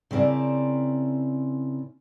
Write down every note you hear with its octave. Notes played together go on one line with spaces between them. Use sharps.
C#3 C4 E4 A#4 D5